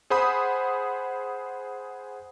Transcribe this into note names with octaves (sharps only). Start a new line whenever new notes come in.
G#4 C5 F#5 B5 D#6